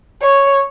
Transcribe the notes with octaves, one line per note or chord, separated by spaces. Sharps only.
C#5